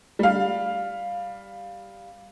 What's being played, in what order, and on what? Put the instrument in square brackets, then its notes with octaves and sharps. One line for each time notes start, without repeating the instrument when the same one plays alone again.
[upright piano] G3 F5